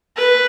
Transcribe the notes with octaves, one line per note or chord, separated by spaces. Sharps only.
B4